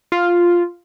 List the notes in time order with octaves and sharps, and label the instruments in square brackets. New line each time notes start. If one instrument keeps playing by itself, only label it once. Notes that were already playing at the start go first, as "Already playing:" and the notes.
[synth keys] F4